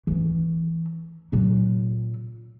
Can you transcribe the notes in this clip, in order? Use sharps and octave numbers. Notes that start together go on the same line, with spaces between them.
E3 C#4
A#2 F#3